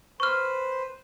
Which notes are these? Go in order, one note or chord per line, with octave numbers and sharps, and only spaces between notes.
B4 C5 C#6 F6